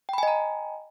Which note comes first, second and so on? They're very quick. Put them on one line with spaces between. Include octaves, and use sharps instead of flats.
G5 B5 G#5 D#5 A#5